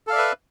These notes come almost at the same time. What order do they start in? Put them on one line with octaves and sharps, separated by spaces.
A4 F5 D5 E5 B4